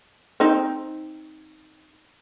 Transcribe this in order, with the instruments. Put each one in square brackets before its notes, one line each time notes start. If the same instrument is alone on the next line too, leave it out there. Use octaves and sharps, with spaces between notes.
[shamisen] C4 D#4